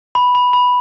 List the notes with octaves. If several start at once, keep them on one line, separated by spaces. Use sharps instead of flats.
B5
B5
B5